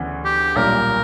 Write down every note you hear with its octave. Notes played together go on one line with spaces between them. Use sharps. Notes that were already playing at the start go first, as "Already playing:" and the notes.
Already playing: D2 C#3 E3 B3
G4
B1 A#2 G3 A#4